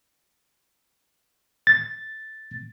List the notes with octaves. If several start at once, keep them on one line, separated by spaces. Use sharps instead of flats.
A6